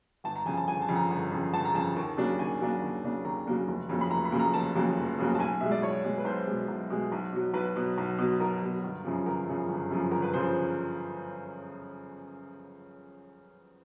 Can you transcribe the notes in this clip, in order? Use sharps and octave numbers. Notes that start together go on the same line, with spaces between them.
G1 A5
A#5
F2 C#3 G#5
A5
G1 G#5
A5
F2 C#3
A#5
G1
F2 C#3
G1 A5
A#5
F2 C#3 A5
D#2
C#3 F#3 A#3 D4
D#2 G#5
C#3 F#3 A#3 D4
D#2
C#3 F#3 A#3 D4
D#2 A#5
C#3 F#3 A#3 D4
F1
F2 C#3 F#3 A#3
B5
F1 A#5
B5
F2 C#3 F#3 A#3
A#5
F1 A5
F2 C#3 F#3 A#3
F1
F2 C#3 F#3 A#3
A5
B1 G#5
B2 G#3 E5
D5
B1 C#5
B2 G#3
B4
B1 C5
B2 G#3
B1
B2 G#3
B1
B2 F#3
B1 B4
B2 F#3
B1
B2 F#3
B1 A#4
B2 F#3
G1
F#2 C#3 F3
G1 A#4
F#2 C#3 F3
G1
F#2 C#3 F3
G1 A#4
B4
C#3 F3 C5